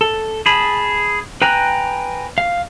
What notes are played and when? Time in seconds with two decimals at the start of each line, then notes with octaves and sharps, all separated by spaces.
0.01 A4
0.46 G#4 A5 B5
1.42 B4 G5 G#5 A#5 F#6
2.38 F5